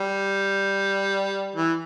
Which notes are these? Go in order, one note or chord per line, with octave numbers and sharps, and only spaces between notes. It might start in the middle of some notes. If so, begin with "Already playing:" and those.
Already playing: G3
E3